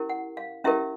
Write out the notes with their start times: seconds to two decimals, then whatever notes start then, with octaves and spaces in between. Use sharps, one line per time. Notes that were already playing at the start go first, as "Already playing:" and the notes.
Already playing: C#4 E4 G4 A#4
0.09 F#5
0.37 F5
0.64 C#4 E4 G4 A#4 E5